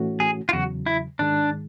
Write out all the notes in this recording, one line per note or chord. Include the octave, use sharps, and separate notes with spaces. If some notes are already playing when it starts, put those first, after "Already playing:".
Already playing: A2 E3 A3 C#4 F#4
G#4
F4
E2 C#3 F#3 F#4
E4
G#2 D#3 G#3 D4